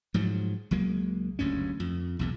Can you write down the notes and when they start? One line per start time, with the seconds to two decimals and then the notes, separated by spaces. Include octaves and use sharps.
0.14 G#2 F3 F#3
0.71 C#2 F#3 G#3 A#3
1.39 F#1 D2 G2 C#4
1.80 F2
2.19 B1 E2 A#2